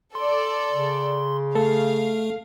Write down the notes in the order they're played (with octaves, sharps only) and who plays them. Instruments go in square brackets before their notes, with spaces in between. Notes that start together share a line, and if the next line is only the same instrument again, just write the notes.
[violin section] A4 D5 [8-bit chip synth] C6
[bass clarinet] C#3
[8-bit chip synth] A3 [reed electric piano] A4 [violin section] F5